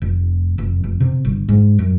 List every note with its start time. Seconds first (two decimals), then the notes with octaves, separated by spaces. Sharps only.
0.02 F1
0.58 F1
0.84 F1
1.00 C3
1.25 G1
1.49 G#2
1.79 F#2